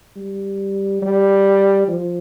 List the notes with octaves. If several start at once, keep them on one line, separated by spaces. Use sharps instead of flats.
G3
G3
F3